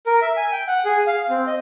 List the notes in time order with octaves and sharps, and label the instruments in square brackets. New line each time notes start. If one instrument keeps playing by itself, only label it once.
[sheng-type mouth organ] A#4
E5
G#5
G5
F#5
G#4
F5
C4
D#5